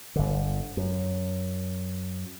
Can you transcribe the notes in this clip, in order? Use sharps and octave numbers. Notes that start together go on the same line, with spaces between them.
G1 D3
F#2